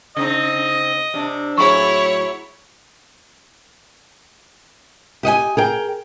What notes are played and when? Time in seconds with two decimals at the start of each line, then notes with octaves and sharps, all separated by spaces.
0.17 C#3 C4 D#4 D#5
1.14 C3 D4
1.57 A2 F#3 E4 G#4 C#5 C#6
5.23 G4 D#5 F#5 G#5
5.57 G#4 A#4 G5